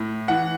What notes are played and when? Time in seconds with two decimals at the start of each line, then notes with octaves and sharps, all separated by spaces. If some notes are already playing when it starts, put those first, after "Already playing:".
Already playing: A2
0.28 E3 F#5